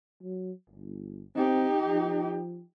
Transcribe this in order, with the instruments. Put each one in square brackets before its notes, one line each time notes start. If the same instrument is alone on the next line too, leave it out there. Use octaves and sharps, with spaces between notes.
[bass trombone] F#3
G1
[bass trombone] C4 [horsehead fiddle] D#4 G4
[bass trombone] F3